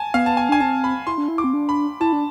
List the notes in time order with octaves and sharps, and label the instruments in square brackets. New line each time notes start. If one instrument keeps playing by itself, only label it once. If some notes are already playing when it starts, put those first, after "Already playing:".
Already playing: [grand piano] G#5 A5
[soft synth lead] B3 [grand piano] F5
[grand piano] A5
G#5
[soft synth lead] D4 [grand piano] G#5
[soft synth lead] C4 [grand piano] A5
[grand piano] B5
[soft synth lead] E4 [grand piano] C6
[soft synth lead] D4
E4
[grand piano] D6
[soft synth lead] C4
D4
[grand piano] B5
[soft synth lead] E4 [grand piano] A5
[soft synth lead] D4